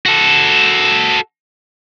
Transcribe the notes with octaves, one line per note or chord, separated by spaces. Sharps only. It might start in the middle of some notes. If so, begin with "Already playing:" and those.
F#4 A4